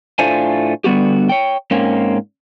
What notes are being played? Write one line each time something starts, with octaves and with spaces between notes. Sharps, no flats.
A2 A3 D4 F4 C5 G#5
D3 G3 B3 F#4 G4
C#5 G5
G#2 A#3 C4 C#4